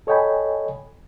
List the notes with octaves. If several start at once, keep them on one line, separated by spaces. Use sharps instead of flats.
A4 C#5 D#5 G5 G#5 B5